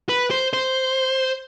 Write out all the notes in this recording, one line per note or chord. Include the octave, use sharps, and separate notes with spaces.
B4
C5
C5